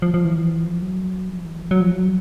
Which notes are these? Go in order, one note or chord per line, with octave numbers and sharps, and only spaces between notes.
F3
F3
E3
F3
F#3
F3
E3
F3
F#3
F3
F#3